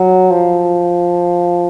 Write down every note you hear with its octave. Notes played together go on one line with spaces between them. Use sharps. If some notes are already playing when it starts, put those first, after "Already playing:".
Already playing: F#3
F3